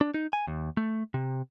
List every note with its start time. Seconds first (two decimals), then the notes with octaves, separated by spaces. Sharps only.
0.01 D4
0.14 D#4
0.33 G#5
0.47 D#2
0.77 A3
1.14 C3